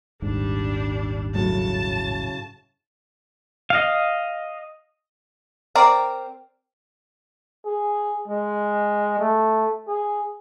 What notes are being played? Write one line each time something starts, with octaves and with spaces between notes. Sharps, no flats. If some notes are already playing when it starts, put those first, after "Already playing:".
D#1 G#1 G#2 G3 D4
A2 C#3 F#3 A5
D#5 F5
C4 A#4 D5
G#4
G#3
A3
G#4